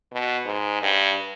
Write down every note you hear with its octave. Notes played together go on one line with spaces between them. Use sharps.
B2
G#2
G2